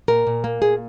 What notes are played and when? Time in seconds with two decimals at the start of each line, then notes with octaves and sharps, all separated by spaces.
0.08 A#2 A#4
0.27 A#2
0.44 A#3
0.62 A#2 G#4